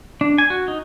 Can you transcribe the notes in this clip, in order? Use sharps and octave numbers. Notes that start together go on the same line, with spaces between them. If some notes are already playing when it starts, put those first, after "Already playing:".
D4
G#5
F#4
D#4